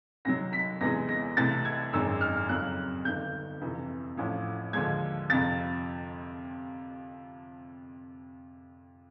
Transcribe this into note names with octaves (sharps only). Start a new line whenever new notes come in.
C2 C3 D#3 F#3 A#6
B6
E2 C3 E3 G#3 A#6
A#6
C2 C3 E3 A3 A6
G#6
G#1 F#2 D#3 G#3 E6
F6
F2 C#3 F#3 F#6
G1 G2 D#3 G6
F2 C3 E3
A1 A2 F3
D#2 D3 F3 G#3 G#6
F2 C3 F3 A6